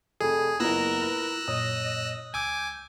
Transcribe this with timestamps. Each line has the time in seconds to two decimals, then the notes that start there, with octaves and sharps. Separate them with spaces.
0.21 F1 F2 G#4 A4
0.60 F#1 B3 E4 F4 A#4 E6 F#6 A#6
1.02 B4
1.48 F#2 A#2 C#5 D#5 D#6
2.34 C#2 G#5 D6 E6 G6